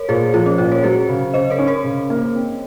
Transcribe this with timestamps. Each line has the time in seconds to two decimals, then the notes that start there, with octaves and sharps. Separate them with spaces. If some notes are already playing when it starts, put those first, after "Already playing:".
Already playing: A#4 C#5
0.09 A#2 G#4 C5
0.34 F3 F4 G#4
0.46 C#4
0.58 A#2 F4 G#4
0.71 A#4 C#5
0.83 F#3 G#4 C5
1.09 C#3
1.34 C#3 C5 D#5
1.50 A#4 C#5
1.59 C#4
1.67 A#4 C#5
1.84 C#3
2.10 A#3
2.35 C4